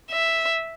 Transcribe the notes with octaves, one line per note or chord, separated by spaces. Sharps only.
E5